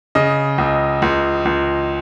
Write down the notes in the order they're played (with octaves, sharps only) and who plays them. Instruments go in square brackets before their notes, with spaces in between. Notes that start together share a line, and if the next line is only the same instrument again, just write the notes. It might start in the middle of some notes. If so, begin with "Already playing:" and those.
[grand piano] C#3 D#5
C#2
C#2
C#2